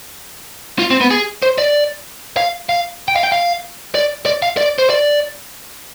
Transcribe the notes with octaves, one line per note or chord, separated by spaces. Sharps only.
F4
C4
B3
G#4
C5
D5
F5
F5
G5
F5
G5
F5
D5
D5
F5
D5
C5
D5